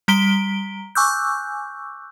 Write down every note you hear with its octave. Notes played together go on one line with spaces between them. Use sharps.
G3 A#5 B6 D7 G7
G#5 C#6 D6 E6 F#6 G6